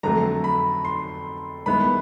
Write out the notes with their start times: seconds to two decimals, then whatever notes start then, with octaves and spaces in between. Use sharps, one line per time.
0.03 F2 D3 F#3 A3 A#5
0.44 B5
0.85 C6
1.66 G2 D#3 G#3 B3 E4 B5